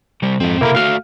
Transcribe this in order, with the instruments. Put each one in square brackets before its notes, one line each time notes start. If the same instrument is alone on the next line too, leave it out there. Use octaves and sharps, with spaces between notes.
[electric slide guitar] C3 G3
[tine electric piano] F2 [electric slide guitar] G#2 C4
[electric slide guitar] C3 A4 [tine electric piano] A#3 E4 A#4
[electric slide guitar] A3 F#4 [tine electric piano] F5 F6